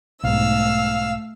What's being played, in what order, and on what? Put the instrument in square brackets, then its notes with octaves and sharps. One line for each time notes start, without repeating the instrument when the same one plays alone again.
[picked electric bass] B1 G#2 [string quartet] A3 E6 [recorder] F5